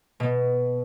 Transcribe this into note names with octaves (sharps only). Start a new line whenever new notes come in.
B2